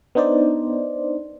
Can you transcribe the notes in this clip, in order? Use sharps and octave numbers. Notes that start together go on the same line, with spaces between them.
B3 D4 D#4 C5 D5